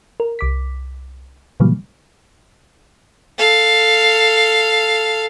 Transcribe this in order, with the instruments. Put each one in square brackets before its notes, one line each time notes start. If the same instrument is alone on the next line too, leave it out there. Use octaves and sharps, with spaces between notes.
[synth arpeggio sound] A#4
C2 D6 B6
A#2 C#3 E3 F#3 G3 A#3
[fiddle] A4 F5